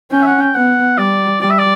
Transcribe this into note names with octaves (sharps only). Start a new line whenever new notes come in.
C#4 G5
E5
F#5
G5
B3 F#5
G3 D5
G3 D5
E5
D5